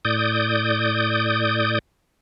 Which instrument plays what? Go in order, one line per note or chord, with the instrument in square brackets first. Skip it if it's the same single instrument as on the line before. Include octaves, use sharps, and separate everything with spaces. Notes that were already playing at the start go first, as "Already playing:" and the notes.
[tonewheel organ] A2 D5 D#6 G6